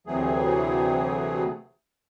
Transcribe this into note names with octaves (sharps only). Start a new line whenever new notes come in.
D2 C3 E3 F#3 A3 G#4